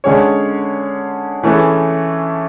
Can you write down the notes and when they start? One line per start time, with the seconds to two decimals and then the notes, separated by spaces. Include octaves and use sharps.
0.04 D3 G#3 C#4 G#4 C#5
1.43 E3 A3 C#4 G#4 B4